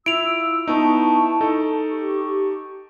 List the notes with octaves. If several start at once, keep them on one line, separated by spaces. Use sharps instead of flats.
E4 F4 E6 D7 F7
B3 D#4 E4 A5 C#6
D#4 A4
G4 C#6